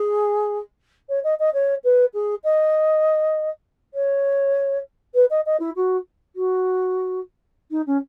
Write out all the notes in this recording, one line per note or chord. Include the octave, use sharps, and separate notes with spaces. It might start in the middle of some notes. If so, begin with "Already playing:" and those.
Already playing: G#4
C#5
D#5
D#5
C#5
B4
G#4
D#5
C#5
B4
D#5
D#5
E4
F#4
F#4
D#4
C#4